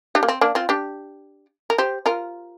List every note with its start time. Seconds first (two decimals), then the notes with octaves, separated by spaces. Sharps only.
0.15 D4 G4
0.23 A#3
0.28 C4
0.41 A#3 D4
0.55 C4 F4
0.69 D4 G4
1.70 A#4
1.78 G4 C5
2.06 F4 A#4